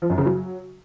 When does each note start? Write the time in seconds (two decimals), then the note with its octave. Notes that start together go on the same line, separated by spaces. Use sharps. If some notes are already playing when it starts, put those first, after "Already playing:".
0.02 F3
0.10 F#2
0.18 C#3
0.26 F#3